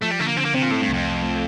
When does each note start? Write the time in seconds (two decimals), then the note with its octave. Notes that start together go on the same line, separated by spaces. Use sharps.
0.02 F3 A3
0.11 G3
0.20 D3 A3
0.28 A#3
0.36 D3 C4
0.45 A#3
0.54 C3 C4
0.63 A#2
0.71 A2 A3
0.82 G2
0.88 C2
0.93 F2
1.05 C2
1.22 A3